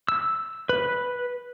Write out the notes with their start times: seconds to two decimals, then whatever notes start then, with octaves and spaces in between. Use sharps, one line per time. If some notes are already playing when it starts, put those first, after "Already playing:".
0.09 E6
0.69 B4